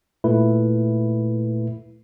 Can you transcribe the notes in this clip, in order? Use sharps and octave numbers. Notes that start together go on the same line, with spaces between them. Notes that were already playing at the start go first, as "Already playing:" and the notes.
A#2 A3 E4 B4